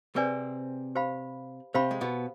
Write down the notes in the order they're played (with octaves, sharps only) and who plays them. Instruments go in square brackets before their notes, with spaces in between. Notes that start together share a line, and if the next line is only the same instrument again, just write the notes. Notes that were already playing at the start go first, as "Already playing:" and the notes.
[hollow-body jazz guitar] C3 C4 [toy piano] G#4 B4 D5 G#5
[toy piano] G4 C5 F5 B5
[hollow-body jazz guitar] C3 C4 [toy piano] G4 C5 F5 B5
[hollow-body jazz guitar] G#3
B2 B3